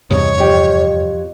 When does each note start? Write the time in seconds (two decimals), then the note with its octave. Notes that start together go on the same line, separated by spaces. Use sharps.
0.10 E2 G2 C3 C#5 D#5
0.38 F2 G4